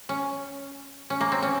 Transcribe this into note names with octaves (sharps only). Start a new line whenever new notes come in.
C#4
C#4
A#3
C4
C#4